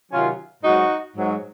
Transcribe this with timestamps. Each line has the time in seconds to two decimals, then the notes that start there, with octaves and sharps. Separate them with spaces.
0.12 C3 D#3 F#3 C#4 F4
0.64 G#2 F#3 D#4 F#4
1.16 G#2 F#3